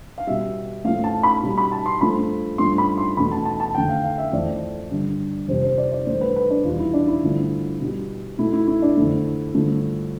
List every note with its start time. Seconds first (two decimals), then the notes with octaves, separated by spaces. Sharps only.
0.18 F5
0.27 B2 G3 E5
0.85 A2 F3 A3 F5
1.04 A5
1.23 B5
1.43 B2 G3
1.58 B5
1.72 A5
1.86 C6
2.01 G2 F3 A3 B5
2.58 G2 F3 A3 C6
2.78 B5
2.98 C6
3.17 E2 B2 A3 B5
3.32 A5
3.45 A5
3.60 A5
3.75 F2 D3 A3 G5
3.89 F5
4.04 F5
4.18 E5
4.33 F2 E3 A3 D5
4.91 G2 D3 G3
5.48 F2 C3 G3 C5
5.63 C5
5.78 D5
5.92 D5
6.07 G2 E3 A3 C5
6.21 B4
6.36 B4
6.50 D4
6.65 E2 B2 G3 F4
6.79 E4
6.93 D4
7.08 E4
7.22 G2 D3 F3 A3
7.81 B2 G3
8.38 B2 A3 E4
8.53 E4
8.68 E4
8.82 D4
8.97 F2 D3 A3 E4
9.55 G2 D3 F3 A3